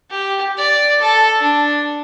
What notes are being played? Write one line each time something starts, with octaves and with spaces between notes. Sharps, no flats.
G4
D5
A4
D4